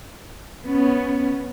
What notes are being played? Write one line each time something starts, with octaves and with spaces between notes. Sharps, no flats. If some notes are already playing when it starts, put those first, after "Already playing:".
B3 C#4